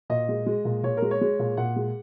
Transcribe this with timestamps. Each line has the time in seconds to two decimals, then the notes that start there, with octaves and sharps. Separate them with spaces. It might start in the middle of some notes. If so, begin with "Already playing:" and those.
0.10 A#2 D#5
0.29 G#3
0.46 G#3
0.65 A#2
0.83 A#2 C#5
0.97 A#4
1.02 G#3
1.11 C#5
1.21 G#3
1.39 A#2
1.57 A#2 F#5
1.76 G#3